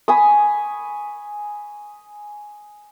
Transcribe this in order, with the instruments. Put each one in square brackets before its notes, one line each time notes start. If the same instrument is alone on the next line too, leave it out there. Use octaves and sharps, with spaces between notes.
[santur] G#5 B5 C#6 D#6